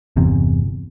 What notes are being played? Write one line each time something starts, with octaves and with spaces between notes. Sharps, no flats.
G1 E2 C3